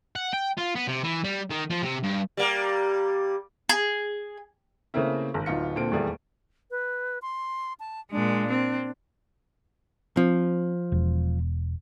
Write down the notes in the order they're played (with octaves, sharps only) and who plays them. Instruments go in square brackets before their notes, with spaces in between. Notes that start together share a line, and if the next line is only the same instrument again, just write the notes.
[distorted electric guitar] F#5
G5
F4
B3
C3
E3
G3
D#3
F3
C3
G2
[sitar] G3 A#3
[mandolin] G#4
[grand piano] C#3 A3 A#3 C4 E4
G#1
D1 D#4 F4 C#7
A#2 D3 C4 D7
D#1 E2 G3 A3 G#4 D5
[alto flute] B4
C6
A5
[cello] A#2 G#3 [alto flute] D4
[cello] C4
[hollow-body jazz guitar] F3 [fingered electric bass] C4
[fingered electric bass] E1